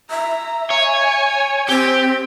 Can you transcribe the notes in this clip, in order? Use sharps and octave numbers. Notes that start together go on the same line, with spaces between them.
E5 A#5
C#5 G#5
C4 G4